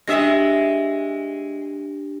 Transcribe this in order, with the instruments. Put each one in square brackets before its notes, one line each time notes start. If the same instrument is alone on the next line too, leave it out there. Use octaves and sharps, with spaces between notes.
[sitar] G#3 E5 [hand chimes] D4 G4 A#6